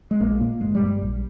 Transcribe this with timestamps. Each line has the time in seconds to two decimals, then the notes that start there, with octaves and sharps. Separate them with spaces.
0.11 G#3
0.20 A#1 A#3
0.40 A#2 A#3
0.61 G1 G#3
0.75 G3
0.81 G2
1.01 A#1